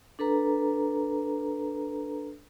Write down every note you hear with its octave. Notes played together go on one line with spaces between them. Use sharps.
D4 A4 B4 A#5